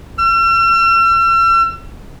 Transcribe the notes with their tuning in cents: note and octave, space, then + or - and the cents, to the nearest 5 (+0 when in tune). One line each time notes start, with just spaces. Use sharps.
E6 +45